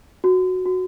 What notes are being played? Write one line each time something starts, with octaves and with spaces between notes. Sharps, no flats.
F#4
F#4